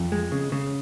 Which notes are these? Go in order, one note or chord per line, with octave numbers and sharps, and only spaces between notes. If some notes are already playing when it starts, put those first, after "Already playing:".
Already playing: F2
G#3
C#3
C#3